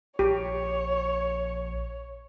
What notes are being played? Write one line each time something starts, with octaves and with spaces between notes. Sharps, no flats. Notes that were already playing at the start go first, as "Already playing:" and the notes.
A#1 G4 C#5